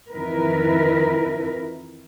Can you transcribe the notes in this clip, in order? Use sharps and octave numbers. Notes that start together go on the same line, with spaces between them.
F2 D#3 E3 E4 A#4 B4